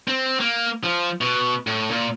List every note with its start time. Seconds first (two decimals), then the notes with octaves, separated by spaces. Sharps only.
0.08 C4
0.40 A#3
0.84 F3
1.21 B2
1.67 A2
1.91 A#2